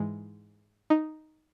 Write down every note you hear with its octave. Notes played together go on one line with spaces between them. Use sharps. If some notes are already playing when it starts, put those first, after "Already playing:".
Already playing: G#2 E3 G#3
D#4